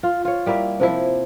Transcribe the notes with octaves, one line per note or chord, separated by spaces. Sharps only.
F4
F4 C#5
G3 A#3 E4 G4
C3 F3 E4